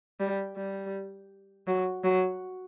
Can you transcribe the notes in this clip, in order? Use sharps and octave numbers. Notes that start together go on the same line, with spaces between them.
G3
G3
F#3
F#3